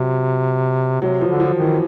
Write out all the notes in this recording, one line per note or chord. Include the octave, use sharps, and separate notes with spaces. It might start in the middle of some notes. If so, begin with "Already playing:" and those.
Already playing: C3 F#3
C3 F#3
F3
D3
F3
D#3
E3